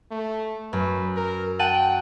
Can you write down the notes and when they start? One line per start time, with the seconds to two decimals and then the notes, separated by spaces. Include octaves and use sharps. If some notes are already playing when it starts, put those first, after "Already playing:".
0.11 A3
0.73 F#2 B4
1.16 A#4
1.59 F#5 G5 A5 D#7